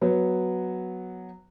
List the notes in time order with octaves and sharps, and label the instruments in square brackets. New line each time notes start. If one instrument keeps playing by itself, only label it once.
[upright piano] F#3 B3